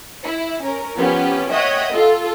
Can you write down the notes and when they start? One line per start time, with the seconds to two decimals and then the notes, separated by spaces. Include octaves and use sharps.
0.24 E4
0.64 C#4 A#4
0.98 F3 B3 C#4 G4
1.52 C#5 D#5 E5 F#5 G5 D#6
1.93 F4 A4